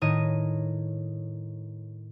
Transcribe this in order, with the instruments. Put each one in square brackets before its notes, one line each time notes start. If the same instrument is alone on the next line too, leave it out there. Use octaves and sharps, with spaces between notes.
[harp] A2 D#3 C#5 D#5 D#7